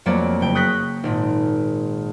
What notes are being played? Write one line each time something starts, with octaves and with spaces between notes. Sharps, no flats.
F2 F#3 A3 A#3 C#5 D5
F#1 G5
C#6 D#6 F#6 G6 A#6 B6
G#1 A#2